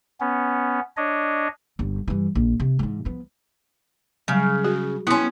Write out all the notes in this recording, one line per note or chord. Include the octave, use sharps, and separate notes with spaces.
B3 C#4
D4 C#5 D#5
G1
G2 E3
A#1
C3
G#2 E3
F3 B3
C#3 F#3 G3
F#4 G#4
B3 C#4 E4 C6